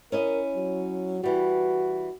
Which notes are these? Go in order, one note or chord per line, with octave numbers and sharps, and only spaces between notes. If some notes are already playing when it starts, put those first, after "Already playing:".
C#4 E4 A#4 D#5
F#3
E3 G3 F#4